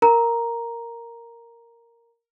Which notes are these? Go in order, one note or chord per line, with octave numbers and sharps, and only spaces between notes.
A#4 A#5